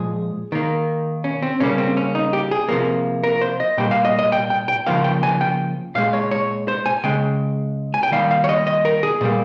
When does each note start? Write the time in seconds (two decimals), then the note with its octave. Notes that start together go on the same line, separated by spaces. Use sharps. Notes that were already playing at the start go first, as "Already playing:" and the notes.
Already playing: A#2 F3 G#3 G#4
0.52 D#3 A#3
1.24 C#4
1.42 C4
1.60 C#3 G3 A#3 C#4
1.78 C4
1.97 C#4
2.15 D#4
2.33 G4
2.51 G#4
2.69 C3 F3 A#3
3.24 A#4
3.41 C5
3.60 D#5
3.78 A#2 G3 A#3 G5
3.91 F5
4.05 D#5
4.19 D#5
4.32 G5
4.50 G5
4.68 G5
4.86 C#3 F3 A#3 F5
5.04 G5
5.23 G#5
5.41 G5
5.95 A#2 G#3 F5
6.13 C#5
6.31 C#5
6.68 C5
6.86 G#5
7.04 C#3 G#3 G5
7.94 G#5
8.03 G5
8.12 D#3 G3 A#3 F5
8.31 F5
8.44 C#5
8.49 D#5
8.67 D#5
8.85 A#4
9.03 G#4
9.21 A#2 G3 A#3